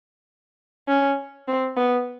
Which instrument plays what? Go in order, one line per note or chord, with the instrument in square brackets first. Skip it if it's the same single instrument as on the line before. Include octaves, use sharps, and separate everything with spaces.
[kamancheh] C#4
C4
B3